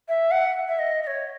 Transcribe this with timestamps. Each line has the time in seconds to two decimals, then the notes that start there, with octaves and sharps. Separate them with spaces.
0.09 E5
0.31 F#5
0.68 E5
0.79 D#5
1.03 D#5
1.07 C#5